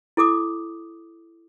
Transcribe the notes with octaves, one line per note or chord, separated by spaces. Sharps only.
E4 A4 D6 D#6